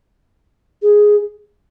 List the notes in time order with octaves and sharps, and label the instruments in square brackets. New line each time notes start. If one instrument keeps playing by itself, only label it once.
[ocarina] G#4